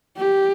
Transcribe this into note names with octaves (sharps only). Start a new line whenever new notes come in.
G4